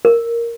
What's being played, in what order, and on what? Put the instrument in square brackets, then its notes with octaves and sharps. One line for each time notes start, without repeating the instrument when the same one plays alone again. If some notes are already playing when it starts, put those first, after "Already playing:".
[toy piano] A#4